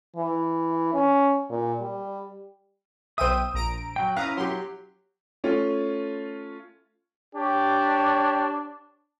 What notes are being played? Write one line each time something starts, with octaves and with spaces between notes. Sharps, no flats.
E3
C#4
A#2
G3
B1 C5 E5 G5 D#6 D#7
A#1 A#5 D7
F#3 G5
C#4 E4 E5 F5 A#5 D#6 F#6
F#3 G4 C6
A3 C#4 F4
D4 G4 C#5